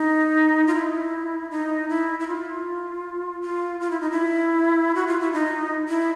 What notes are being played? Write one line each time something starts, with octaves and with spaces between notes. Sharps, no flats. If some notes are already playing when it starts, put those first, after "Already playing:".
Already playing: D#4
F4
E4
D#4
E4
E4
F4
F4
F4
E4
D#4
E4
F#4
F4
E4
D#4
E4